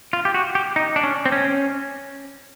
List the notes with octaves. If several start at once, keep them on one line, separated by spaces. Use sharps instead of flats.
F4
G4
F#4
G4
D#4
D4
C#4
C4
C#4